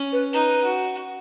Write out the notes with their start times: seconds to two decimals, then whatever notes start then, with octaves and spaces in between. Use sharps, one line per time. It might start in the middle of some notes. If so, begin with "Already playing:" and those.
Already playing: C#4
0.12 B4
0.32 D#4 B4
0.64 F#4